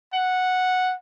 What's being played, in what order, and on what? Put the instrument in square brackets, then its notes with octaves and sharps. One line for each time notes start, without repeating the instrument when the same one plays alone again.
[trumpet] F#5